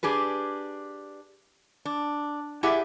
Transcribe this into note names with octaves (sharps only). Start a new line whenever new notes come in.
D4 G4 G#4 B4
D4
E4 G4 G#4 D5 E5 F#5